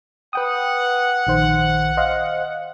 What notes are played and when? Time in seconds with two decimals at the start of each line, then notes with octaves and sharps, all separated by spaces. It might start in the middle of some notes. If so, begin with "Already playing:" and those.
0.33 B4 F#5 G5 D#6
1.27 A#1 D#3 C5
1.97 C5 D#5 F5